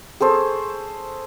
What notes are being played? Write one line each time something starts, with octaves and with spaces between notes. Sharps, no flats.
G#4 A4 C5 C#6